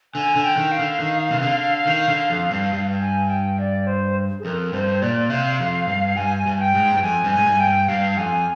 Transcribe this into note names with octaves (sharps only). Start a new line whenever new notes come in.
D3 G#5
D3
G5
D#3
F5
D3
D#3
C3
D3
D#3
D3
F2
G2
G2
G#5
G5
D5
C5
G#4
F2 A#4
G2 C5
A#2 D5
C3 F5
F2
G2
G2 G#5
G2
G5
G#2
G2
F2 G#5
G2
G#5
G#2
G2
G5
G2
G2 F5
F2 G#5